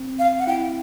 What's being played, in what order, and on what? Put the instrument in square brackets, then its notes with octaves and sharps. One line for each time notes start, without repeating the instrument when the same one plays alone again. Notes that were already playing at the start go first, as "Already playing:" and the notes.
Already playing: [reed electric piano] C4
[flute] F5
F#5
[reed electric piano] E4 [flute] G5